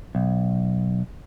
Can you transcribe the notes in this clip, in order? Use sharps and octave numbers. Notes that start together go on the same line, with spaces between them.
B1